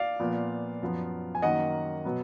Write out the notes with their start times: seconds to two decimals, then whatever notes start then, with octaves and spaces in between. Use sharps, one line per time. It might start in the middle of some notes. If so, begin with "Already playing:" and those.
Already playing: D5 F5
0.20 A#2 F3 B3
0.82 F#2 F3 B3
1.35 G#5
1.42 F#2 D#3 A#3 D#5 F#5
2.05 B2 F#3 B3